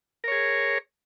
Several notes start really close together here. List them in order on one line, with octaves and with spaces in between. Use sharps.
A#4 C#5 G#4